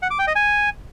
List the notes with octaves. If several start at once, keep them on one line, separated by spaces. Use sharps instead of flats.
F#5
D6
G5
D#5
G#5